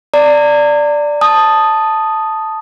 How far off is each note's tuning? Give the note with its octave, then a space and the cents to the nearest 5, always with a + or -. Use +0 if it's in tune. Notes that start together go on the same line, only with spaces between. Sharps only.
D5 +0 A#5 -40
A5 +0 D#6 +0